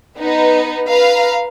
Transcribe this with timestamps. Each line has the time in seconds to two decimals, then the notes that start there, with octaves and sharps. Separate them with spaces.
0.19 B3 D#4
0.89 B4 F5 A#5